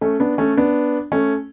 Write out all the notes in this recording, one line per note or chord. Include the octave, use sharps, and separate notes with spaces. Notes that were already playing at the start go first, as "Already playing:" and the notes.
A3 C#4
B3 D4
A3 C#4
B3 D4
A3 C#4